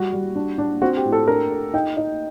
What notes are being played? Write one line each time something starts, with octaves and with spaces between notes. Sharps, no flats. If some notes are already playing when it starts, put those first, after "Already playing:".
Already playing: G3 F#4
G3
D4
D4
C4 F#4
G4
A2
A4
D4 A#4
A4
D#4 G5
D#4